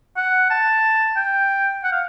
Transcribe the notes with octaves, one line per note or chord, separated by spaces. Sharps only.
F#5
A5
G5
F#5
F5